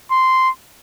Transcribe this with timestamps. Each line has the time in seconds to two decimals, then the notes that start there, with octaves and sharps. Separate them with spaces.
0.11 C6